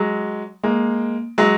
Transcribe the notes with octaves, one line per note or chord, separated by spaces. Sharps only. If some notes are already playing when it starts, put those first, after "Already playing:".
Already playing: F#3 G#3
G#3 A#3
F#3 G#3